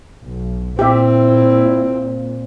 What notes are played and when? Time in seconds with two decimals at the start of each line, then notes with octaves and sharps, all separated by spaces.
0.22 B1
0.79 A#2 C4 E4 G4 E5